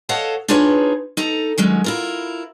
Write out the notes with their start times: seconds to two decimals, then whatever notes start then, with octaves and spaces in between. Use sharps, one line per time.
0.09 A4 C#5 D#5 F5 F#5 A5
0.48 D4 D#4 F4 G#4 B4 C#5
1.17 D#4 A4 A#5
1.58 D#3 F#3 G#3 C#4
1.84 E4 F4 A#4